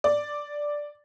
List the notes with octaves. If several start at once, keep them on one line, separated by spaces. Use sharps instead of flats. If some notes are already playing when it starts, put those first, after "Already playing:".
D5